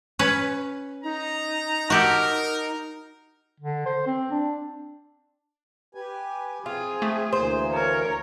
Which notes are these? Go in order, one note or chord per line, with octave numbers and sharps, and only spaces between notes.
C#4 B4
D#4 A#5
F#4 G4 A4 A#4
D3
C5
C4
D4
G4 B4 G#5
C4 F4 G#4
A3
D2 E3 A#3 C5
A#4 C#5